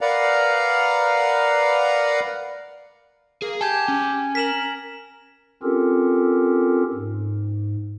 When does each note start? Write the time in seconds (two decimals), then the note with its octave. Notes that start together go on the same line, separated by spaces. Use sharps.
0.01 A#4 B4 D5 F5 F#5 A#5
3.42 A#3 G#4
3.61 G4 G#5 A5 G#6
3.88 C#4
4.35 A#4 B6 E7 F#7
5.63 C4 C#4 F4 G4 A4 A#4
6.94 G#2